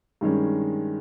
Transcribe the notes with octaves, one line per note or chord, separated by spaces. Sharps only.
G2 D#3 G#3 C#4